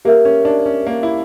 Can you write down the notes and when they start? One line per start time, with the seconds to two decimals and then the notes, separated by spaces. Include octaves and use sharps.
0.05 A#3 G4 A#4 E5
0.25 C#4
0.45 D4
0.66 C#4
0.87 A#3
1.03 E4